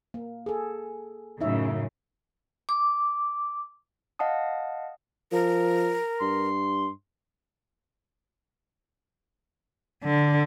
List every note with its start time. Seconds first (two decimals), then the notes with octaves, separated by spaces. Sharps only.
0.14 A#3
0.46 G#4 A4
1.41 F#2 A2 C#3 D#4 E4 E5
2.69 D6
4.19 D#5 F5 F#5 A5 D#6
5.32 F3 A#4
6.21 G2 C6
10.04 D3